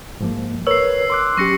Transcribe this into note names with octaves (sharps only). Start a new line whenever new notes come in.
G#2 F3 A#3
A#4 B4 C#5 E6 C7
C6 D6 F#6
F#3 C#4 G4 C#6 A#6 C#7